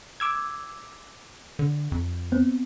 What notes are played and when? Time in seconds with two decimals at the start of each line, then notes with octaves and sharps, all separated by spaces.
0.20 D6 E6 G#6
1.59 D3
1.92 F2
2.32 B3 C4